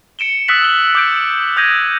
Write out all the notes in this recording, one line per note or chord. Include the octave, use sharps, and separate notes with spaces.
C#7 D7 E7 G7
D#6 E6 F#6 A6 B6 F#7
E6 F6 F#7 G7
D6 G6 D7
D#6 E6 G6 G#6 A#6 D#7